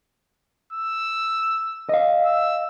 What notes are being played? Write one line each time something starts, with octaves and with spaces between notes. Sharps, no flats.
E6
D#5 F5
E6